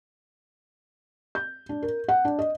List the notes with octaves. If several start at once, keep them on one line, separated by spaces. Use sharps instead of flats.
G6
D4
A#4
F#5
D4
D#5